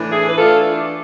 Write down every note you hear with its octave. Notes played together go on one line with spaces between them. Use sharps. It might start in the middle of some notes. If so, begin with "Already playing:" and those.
Already playing: A2 E3 A3 D4
E4 G#4
B4
E3 A3 D4 F4 A4